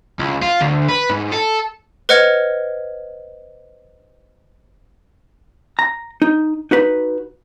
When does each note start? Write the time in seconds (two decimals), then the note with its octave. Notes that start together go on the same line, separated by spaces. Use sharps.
0.19 C#2
0.42 F4
0.61 D2
0.89 B4
1.09 G#2
1.32 A4
2.09 B4 C5 D#5 F#5 F6 G#6
5.79 A#5
6.22 D#4
6.71 D#4 F#4 B4